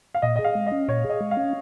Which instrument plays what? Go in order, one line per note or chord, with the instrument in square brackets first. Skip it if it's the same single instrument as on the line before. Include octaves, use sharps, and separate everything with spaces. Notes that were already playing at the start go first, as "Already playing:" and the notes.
[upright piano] F5
[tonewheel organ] A#2 [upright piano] D#5
[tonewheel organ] G#4 [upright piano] D#5
[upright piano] F5
[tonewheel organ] G#3
[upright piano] D#5
[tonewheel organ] C#4
[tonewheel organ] A#2 [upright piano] C#5
[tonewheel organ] G#4
[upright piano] D#5
[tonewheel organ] G#3
[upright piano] F5
[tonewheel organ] C#4